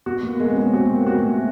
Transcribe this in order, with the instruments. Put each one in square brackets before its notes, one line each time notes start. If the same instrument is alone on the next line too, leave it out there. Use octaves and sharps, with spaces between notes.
[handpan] B3 [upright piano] F#4
[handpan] A#3
[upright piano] G#3 [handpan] B3
[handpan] C4
C#4
[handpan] C4 [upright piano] F#4
[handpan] A#3
B3
[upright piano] F#4
[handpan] A3